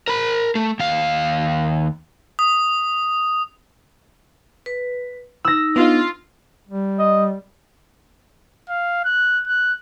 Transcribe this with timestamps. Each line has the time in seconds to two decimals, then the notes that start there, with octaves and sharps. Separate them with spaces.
0.08 A#4 B5
0.55 A3
0.79 D#2 F5
2.39 D#6
4.66 B4
5.45 D#4 E6 A#6
5.76 B3 D4 D#4 F4
6.69 G3
6.99 D#5
8.69 F5
9.05 F#6
9.47 F#6